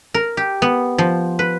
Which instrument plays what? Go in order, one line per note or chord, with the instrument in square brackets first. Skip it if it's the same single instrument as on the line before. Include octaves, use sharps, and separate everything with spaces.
[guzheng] A#4
G4
B3
F3
B4